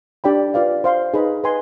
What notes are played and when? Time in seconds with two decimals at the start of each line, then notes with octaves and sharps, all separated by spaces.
0.24 D4 G4 D5 G5 B5
0.54 F4 B4 D5 F5
0.84 C5 F5 C6
1.14 D#4 G#4 B4 D#5 B5
1.44 B4 D#5 G#5 C6